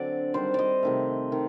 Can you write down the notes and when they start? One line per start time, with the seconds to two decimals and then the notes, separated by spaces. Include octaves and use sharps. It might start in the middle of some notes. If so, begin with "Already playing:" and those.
Already playing: D3 F#3 C4 D4 D5
0.34 D#3 G3 D4 C5
0.54 D5 D#5
0.83 C3 D#3 A3
1.32 D#3